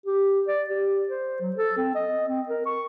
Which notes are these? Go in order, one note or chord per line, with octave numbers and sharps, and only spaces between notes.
G4
D5
G4
C5
F#3
A4
C4
D#5
C4
A#4
C#6